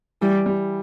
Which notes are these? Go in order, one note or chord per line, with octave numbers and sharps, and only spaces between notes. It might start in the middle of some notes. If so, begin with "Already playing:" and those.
E3 G3
G3